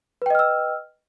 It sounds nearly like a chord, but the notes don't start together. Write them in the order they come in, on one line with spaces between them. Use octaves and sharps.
B4 G5 D#5 F6 E6